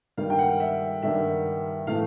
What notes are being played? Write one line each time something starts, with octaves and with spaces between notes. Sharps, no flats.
G2 D#3 G3 A#3 F5
G5
F#5
E5
G2 D#3 G3 A#3 E5
A2 E3 A3 F5